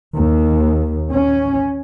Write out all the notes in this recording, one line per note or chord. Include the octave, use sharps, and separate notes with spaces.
D#2
C#4